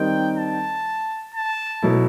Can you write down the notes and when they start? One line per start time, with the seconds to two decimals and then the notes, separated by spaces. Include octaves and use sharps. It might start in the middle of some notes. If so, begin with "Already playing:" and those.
Already playing: D#3 G3 C4 D#4 G5
0.36 A5
1.34 A5
1.82 B2 F#3 A3 E4